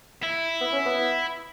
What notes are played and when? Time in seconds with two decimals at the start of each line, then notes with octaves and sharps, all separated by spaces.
0.23 E4
0.61 B3
0.72 C#4
0.86 B3